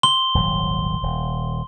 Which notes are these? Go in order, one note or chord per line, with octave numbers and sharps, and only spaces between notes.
C6 G7
D#1 G#1 F#3
D#1